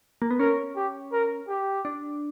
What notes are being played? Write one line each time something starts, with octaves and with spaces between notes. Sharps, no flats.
A#3
B3
C#4 A#4
G4
A#4
G4
D4